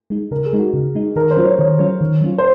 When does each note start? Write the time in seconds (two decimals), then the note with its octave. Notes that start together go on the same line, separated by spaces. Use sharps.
0.10 G#3 D#4
0.31 C#3 A#4
0.46 G#4
0.53 G#3 D#4
0.59 F#4
0.74 C#3
0.95 G#3 D#4
1.16 D#3 A#4
1.31 C5
1.37 F#3 C#4 F4
1.44 C#5
1.58 D#3 C#5
1.79 F#3 C#4 F4 C#5
2.01 D#3
2.21 F#3 C#4 F4
2.38 C5